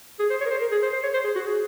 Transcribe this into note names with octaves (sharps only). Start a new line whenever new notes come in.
G#4
C5
C#5
A#4
C5
A#4
G#4
C5
C5
C#5
C5
G#4
F#4
G#4